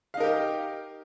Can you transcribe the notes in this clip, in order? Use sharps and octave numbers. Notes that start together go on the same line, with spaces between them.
D#4 G4 A#4 D#5 F5